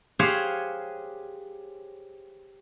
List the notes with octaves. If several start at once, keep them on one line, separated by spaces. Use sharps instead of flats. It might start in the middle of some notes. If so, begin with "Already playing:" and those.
G4 G#4 C5 C#5 F5 F#5